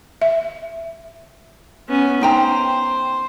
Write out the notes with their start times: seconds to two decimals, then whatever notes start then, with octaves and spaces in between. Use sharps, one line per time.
0.22 E5
1.89 B3 C#4
2.21 D#4 C5 G5 A#5